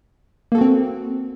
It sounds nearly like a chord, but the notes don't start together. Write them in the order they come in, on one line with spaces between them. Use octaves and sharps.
A#3 A4 F#4 C4